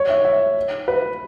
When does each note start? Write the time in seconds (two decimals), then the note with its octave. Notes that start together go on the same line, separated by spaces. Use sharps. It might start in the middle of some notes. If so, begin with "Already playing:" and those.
Already playing: C#5
0.09 E5
0.25 E5
0.88 B4